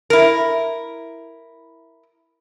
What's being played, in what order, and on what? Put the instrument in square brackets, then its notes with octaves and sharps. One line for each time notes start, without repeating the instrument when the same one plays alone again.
[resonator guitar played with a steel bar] E4 A#4